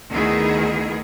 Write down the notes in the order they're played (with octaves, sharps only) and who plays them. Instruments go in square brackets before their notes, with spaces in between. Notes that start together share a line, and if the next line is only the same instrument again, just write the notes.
[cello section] D2 D#3 B3 E4 G#4